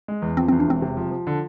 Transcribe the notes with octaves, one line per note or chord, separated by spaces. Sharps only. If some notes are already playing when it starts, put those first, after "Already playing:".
G#3
E2
F3 C4
C4
E2
D4
E1 C4
C3
F3
F3
D3